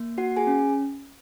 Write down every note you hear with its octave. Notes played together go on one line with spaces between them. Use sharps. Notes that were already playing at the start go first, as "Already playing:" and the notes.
Already playing: A#3
F#4 F#5
G#4 G#5
C#4